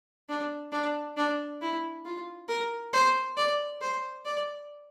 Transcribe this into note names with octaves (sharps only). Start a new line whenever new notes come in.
D4
D4
D4
E4
F4
A#4
C5
D5
C5
D5